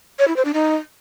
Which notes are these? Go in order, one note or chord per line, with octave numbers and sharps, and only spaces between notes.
C#5
E4
C5
D4
D#4